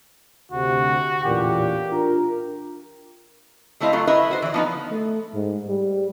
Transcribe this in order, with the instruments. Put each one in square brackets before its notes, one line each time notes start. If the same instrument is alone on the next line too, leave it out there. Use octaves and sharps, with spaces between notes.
[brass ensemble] D2 C3 [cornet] F#4
[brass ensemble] A1 E2 A#2 [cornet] G4
[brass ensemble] D4 F4 A#4
[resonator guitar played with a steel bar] G3 A3 C4 E4 D#5 F5
F#3 A3 F4
E4 A#4 B4 D#5 E5
F#4 C5
E3 D5
F3 B3 D#4
[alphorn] A3
G#2
G3